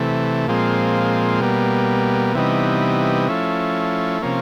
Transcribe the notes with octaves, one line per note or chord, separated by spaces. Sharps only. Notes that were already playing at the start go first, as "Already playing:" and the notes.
Already playing: C3 E3 A3
A#2 F3 G#3 C4
B2 G3 A#3
C3 E3 G3 B3 D#4
F3 A3 C#4 E4
C3 F3 A#3 C#4